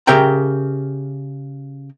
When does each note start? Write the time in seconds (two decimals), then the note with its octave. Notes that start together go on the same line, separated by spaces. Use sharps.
0.07 C#3 G4 A#4 E5 G5 A#5